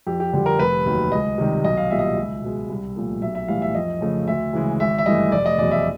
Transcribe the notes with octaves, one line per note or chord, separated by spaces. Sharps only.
F2 G4
G4
D3 G3
A#4
F1 B4
D#2 D#3 F#3
C#2 D#5
C3 D#3 G3
B1 D#5
F5
A#2 G3 E5
D#5
E5
C#2
B2 G#3
C2
A#2 F3 A3
B1 E5
E5
A2 E3 G3 F5
E5
F2 D#5
C#3 F3 A3
D2 E5
C#3 E3 G#3
G#1 E5
E5
G2 E3 A3 D#5
F1 D5
D#5
E2 B2 F#3 D5
E5